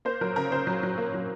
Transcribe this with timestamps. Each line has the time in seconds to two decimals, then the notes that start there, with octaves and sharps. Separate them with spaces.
0.05 A#3 C5
0.21 F#3 A#4
0.36 C#3 A#4
0.52 C#3 C5
0.67 F#3
0.83 F#3
0.98 A#3
1.14 F#3